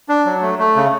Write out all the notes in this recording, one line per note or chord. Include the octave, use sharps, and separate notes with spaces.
D4
F#3
A3
A3
C#3